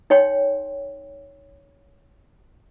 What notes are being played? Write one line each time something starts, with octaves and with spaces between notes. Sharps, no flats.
D#4 C#5 G5 C6